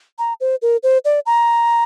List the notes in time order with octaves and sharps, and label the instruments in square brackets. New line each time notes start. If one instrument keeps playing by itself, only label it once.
[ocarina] A#5
C5
A#4
C5
D5
A#5